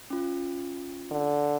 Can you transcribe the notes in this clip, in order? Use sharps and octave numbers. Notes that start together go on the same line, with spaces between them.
C#4 F4
D3